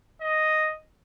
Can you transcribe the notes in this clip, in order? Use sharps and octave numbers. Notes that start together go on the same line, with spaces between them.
D#5